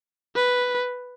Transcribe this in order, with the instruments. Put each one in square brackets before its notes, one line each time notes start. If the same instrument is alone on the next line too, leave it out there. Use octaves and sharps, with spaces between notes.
[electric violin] B4